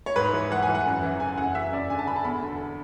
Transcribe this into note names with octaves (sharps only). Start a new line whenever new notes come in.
C#5
G#2 B4
E3
E3 F#5
G#5
E3
F#5
F#2
E3
C#3 G#5
F#2 F#5
F#2 E5
F#2 D5
D3 G#5
A5
D3 B5
A5
E2 B5
D3